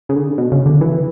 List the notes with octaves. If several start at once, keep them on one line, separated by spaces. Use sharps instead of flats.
C#3
D3
B2
C#3
D3
E3